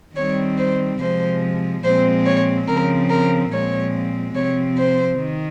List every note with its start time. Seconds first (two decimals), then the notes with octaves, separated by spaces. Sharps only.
0.16 D#3 G3 C4 C#5
0.58 C5
1.00 C3 F3 G#3 C5
1.84 A#2 F3 G#3 C4 C5
2.26 C#5
2.68 C#3 F3 C4 A#4
3.10 A#4
3.52 A#2 F3 G#3 C4 C#5
4.36 C3 F3 C4 C#5
4.78 C5
5.20 D#3